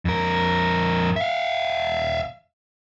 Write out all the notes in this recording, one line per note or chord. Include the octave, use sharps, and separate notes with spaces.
F2 A#4
E5 F5